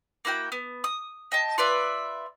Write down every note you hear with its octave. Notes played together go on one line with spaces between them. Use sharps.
A#3 E4 F#4 G5
B3
D#6
D#5 G5 A5
F4 B4 D5 E5